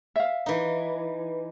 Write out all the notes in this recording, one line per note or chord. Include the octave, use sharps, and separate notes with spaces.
E5 F5
E3 D#4